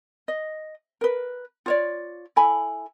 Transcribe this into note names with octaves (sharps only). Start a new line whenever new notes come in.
D#5
A#4 B4
F4 C#5 D5
E4 A4 G#5 B5